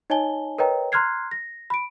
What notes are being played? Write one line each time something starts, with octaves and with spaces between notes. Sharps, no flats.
D#4 C#5 D#5 G#5 A5 G7
A#4 B4 C#5 D#5 G5 A#5
A#5 C6 F6 F#6 G#6 C7
A#6
B5 D7